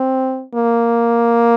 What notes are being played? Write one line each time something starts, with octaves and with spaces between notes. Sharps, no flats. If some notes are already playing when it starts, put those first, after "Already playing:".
Already playing: C4
A#3